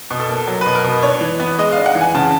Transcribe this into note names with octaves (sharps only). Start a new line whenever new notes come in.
B2
A4
A#3
F#3
B2 B4
A#4
B2
D4 C#5
E3
B3
G#3 D#5
D4 F5
F#5
E3
G#5
C#3 A5